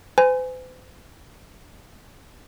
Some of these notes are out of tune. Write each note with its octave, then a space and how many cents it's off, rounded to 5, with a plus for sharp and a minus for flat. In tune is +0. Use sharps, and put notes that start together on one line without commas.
C5 -45 G#5 -5